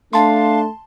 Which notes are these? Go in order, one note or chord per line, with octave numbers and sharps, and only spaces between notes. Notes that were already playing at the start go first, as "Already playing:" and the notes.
A3 D4 F5 A5 C6